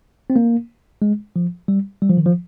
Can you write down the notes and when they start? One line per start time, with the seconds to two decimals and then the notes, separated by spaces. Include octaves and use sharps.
0.30 C4
0.36 A#3
1.02 G#3
1.36 F3
1.68 G3
2.02 G3
2.10 F3
2.17 D#3
2.26 F3